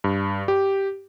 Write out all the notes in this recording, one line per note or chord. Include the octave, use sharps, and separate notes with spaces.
G2
G4